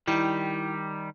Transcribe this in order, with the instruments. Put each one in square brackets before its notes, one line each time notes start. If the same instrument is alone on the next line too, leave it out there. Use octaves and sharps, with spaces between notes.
[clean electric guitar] D#3 G3 [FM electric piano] E4